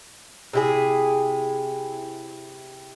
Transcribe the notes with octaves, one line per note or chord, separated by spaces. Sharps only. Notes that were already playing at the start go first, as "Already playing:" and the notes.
C3 E4 G#4